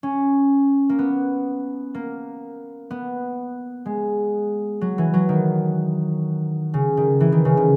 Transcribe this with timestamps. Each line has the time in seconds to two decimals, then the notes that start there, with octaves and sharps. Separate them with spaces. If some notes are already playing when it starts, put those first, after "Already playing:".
0.03 C#4
0.89 A#3
0.99 B3
1.95 A#3
2.91 B3
3.86 G#3
4.81 F#3
4.98 E3
5.14 F#3
5.29 D#3
6.74 C#3
6.97 D#3
7.20 E3
7.32 D#3
7.45 C#3
7.57 D#3